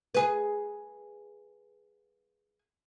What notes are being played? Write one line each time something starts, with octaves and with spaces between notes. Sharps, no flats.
G#4 B4